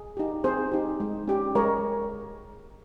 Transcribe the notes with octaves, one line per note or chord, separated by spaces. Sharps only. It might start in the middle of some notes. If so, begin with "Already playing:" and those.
Already playing: G#4
D#4 G4
C4 G#4 C5
D#4 G4
G#3
C#4 G4
G#3 A#4 C#5